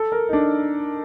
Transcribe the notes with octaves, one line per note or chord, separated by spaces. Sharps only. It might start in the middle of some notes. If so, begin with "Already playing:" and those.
Already playing: A4
A#4
D#4
D4